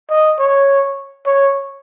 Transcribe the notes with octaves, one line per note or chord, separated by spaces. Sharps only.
D#5
C#5
C#5